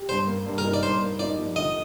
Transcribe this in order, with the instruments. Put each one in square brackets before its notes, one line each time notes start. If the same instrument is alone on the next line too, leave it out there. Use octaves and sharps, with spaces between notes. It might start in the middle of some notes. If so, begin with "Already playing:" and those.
Already playing: [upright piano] G4
[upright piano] G2 [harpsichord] C5
[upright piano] A#3
G2
[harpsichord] A#4
[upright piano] D#4
[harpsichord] D5
[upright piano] G2 [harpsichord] C5
[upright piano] A#3
[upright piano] D#4 [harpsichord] D5
[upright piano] F3
[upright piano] D3 [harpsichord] D#5